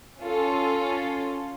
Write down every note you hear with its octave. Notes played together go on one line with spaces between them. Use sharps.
C#4 F4 A4